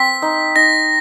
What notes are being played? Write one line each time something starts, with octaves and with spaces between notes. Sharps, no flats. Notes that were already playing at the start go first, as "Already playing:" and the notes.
Already playing: C4 B6
D#4
D#4 A#6